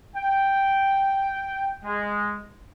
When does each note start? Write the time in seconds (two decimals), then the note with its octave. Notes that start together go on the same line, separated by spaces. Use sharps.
0.16 G5
1.85 G#3